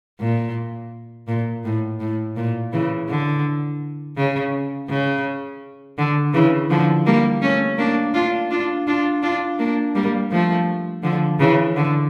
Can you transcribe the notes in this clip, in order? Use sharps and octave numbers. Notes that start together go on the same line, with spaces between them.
A#2
A#2
A2
A2
A#2
C#3 E3
D3
C#3
C#3
D3
C#3 E3
D3 F3
G3 A#3
A3 C#4
A#3 D4
D4 F4
D4 F4
D4 F4
D4 F4
A#3 D4
G3 A#3
F3 A3
D3 F3
C#3 E3
D3